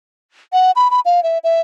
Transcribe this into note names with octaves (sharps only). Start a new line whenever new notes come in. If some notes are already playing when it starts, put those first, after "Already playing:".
F#5
B5
B5
F5
E5
E5